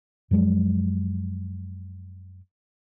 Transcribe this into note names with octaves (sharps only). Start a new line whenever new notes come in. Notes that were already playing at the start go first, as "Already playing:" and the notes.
F#2 F3 F#3 G#3